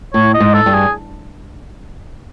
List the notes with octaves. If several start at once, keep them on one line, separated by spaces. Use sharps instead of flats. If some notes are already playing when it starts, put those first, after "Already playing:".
A2 C#5
D#5
G#2
A4
G2
G#4